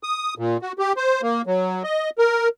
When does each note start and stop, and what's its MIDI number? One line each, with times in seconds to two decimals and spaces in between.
0.03 0.34 87
0.38 0.57 46
0.62 0.72 66
0.79 0.93 67
0.97 1.21 72
1.22 1.42 58
1.46 1.83 54
1.84 2.10 75
2.18 2.48 70